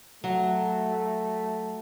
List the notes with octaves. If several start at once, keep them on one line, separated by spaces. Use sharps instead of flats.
F#3 A3